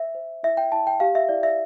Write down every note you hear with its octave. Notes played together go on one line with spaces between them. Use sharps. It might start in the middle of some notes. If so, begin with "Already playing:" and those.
Already playing: C5 E5
C5
E4 E5
G5
E4 A5
G5
G4 F5
E5
E4 D5
E5